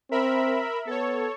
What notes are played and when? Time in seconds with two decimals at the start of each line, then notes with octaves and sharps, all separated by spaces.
0.11 C4 A#4 E5 B5
0.87 B3 A4 C#5